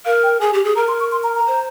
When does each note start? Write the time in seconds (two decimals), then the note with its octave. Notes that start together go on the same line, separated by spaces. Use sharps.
0.05 A#4 F5
0.23 G5
0.40 G#4 G#5
0.53 G4
0.64 G#4
0.76 A#4 A#5
0.88 C6
1.00 C#6
1.12 C6
1.23 A#5
1.35 A#5
1.47 C5